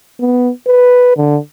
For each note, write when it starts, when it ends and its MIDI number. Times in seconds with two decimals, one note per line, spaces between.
0.20 0.50 59
0.67 1.15 71
1.17 1.38 50